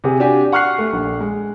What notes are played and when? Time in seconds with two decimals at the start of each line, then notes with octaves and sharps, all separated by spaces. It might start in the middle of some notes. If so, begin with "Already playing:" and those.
0.04 C3 G#4
0.20 D4 F#4 G4 G#5
0.52 F#5 C#6 F6 F#6 C7
0.78 A3
0.93 A#1
1.20 G#3